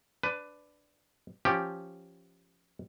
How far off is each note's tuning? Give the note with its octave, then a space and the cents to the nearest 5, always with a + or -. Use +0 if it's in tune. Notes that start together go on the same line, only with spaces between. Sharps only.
D4 +0 B4 +15
F3 +0 C#4 +0 G4 -5